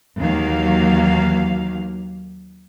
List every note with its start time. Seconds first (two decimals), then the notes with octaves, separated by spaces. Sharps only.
0.19 D#2 D#3 E3 F#3 A#3 F5